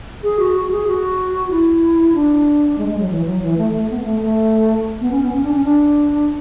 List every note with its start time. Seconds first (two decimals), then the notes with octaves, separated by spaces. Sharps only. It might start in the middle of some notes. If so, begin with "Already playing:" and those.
0.23 G#4
0.39 F#4
0.55 F#4
0.71 G#4
0.87 F#4
1.51 E4
2.15 D4
2.78 G#3
2.89 G#3
2.99 F#3
3.10 E3
3.25 F#3
3.42 E3
3.58 A3
3.73 A3
3.90 B3
4.01 B3
4.05 A3
4.21 A3
5.01 B3
5.12 C#4
5.22 B3
5.32 C#4
5.44 D4
5.54 C#4
5.64 D4